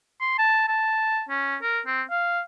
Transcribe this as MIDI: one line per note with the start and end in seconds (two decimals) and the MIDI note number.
0.21 0.35 84
0.39 0.64 81
0.68 1.23 81
1.29 1.56 61
1.62 1.80 70
1.86 2.03 60
2.10 2.41 77